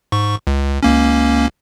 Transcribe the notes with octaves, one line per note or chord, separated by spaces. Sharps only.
G#2 C#6
C#2
C#2 A#3 C#4